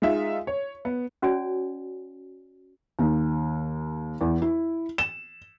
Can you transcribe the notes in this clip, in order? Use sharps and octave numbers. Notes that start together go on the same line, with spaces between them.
G#3 D#4 F4 E5
C#5
B3
C#4 F#4 C#5 D5 G#5
D#2
E2
E4
E7